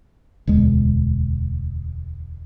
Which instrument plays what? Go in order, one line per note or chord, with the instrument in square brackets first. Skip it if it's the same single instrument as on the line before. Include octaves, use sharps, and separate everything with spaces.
[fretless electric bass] E1 D2 G#3